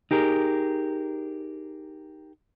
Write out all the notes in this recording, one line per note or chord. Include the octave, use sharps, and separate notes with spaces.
D#4 G4 G#4 A#4